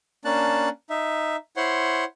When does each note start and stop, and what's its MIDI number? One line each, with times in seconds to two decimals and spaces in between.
0.25 0.69 58
0.25 0.69 61
0.25 0.69 62
0.25 0.69 81
0.25 0.69 90
0.90 1.36 63
0.90 1.36 76
1.57 2.04 64
1.57 2.04 72
1.57 2.04 73
1.57 2.04 78
1.57 2.04 84